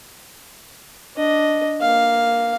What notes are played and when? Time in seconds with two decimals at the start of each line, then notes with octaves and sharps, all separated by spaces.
1.17 D4 D#5
1.81 A#3 F5